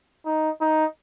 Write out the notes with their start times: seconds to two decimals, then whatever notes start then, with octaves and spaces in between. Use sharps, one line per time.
0.25 D#4
0.61 D#4